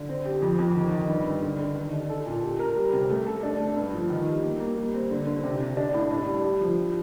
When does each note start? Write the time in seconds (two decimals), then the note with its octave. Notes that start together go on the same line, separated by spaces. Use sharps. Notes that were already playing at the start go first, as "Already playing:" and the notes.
Already playing: D3
0.09 C4
0.25 G4
0.42 F2
0.59 F2
0.75 D#3
0.92 D#3
1.09 G2
1.26 G2
1.42 D3
1.59 D3
1.76 D#3
1.93 D4
2.10 A4
2.26 A#2
2.43 G4
2.59 A#4
2.76 G3
2.93 C3
3.10 A3
3.27 A4
3.43 D4
3.60 A3
3.76 G2
3.93 F3
4.10 D#3
4.27 G3
4.43 A#3
4.60 A#3
4.77 G3
4.93 C4
5.11 D3
5.27 D3
5.43 C3
5.60 C3
5.77 D4
5.94 A2
6.11 D4
6.27 G3
6.44 G4
6.61 F3
6.77 G3